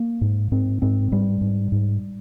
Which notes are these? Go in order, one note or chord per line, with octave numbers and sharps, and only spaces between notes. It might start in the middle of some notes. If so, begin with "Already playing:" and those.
Already playing: A#3
G#2
G#2 C4
G#2 C4
G#2 G3
G#2
G#2